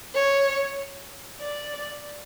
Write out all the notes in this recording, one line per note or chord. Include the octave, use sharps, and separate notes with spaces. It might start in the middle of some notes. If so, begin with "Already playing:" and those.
C#5
D5